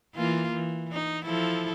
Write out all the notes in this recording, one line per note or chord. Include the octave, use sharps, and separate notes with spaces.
E3 A#3 F4
E3
D#4
F3 E4 A4